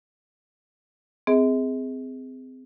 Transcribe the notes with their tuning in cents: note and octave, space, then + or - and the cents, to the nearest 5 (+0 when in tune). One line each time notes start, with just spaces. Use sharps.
C4 -25 G#4 +0 D#5 +45